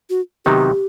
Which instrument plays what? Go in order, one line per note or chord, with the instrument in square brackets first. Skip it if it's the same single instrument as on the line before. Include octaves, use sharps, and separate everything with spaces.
[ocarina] F#4
[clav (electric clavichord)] C3 D#3 F#3 B3 D#4 [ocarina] G4